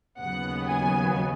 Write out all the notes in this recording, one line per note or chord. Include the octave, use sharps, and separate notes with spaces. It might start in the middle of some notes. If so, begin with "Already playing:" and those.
D#2 C#3 F#3 B3 F#5
G#5